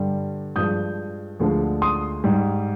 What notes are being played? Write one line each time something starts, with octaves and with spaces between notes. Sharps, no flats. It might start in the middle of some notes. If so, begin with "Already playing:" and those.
Already playing: G2 D3 G3
G2 F3 G#3 D#6 G6
D2 D3 F3 G#3
C6 D#6
G#2 G3